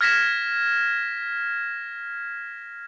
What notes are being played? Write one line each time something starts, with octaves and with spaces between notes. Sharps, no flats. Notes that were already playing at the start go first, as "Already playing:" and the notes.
F6 G#6 A#6 B6 E7